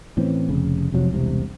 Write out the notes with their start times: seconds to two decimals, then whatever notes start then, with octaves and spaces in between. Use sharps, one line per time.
0.17 A2 E3 C4 C#4
0.49 F1 C#3
0.92 F1 C3 F3 F#3
1.11 E1 C2 C3